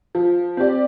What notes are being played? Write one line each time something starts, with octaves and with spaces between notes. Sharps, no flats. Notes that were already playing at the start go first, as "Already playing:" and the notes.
F3
C4 G4 D5